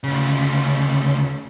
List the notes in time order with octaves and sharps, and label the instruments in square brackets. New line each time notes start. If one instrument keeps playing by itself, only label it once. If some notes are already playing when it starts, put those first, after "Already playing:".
[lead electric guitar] D2 C#3